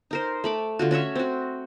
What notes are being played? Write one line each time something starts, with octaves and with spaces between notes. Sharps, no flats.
D#4 A#4 C5
A3 B5 D6
D3 F4 F#4
C#4 F#4 C#5 E5
C4 F#4